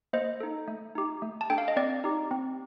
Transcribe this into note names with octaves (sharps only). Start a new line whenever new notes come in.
A#3 C5 D#5
D#4 A4
A3
D#4 G4
A3
A5
D4 A4 G5
F5
D#5
C4 D5
D#4 G4
C4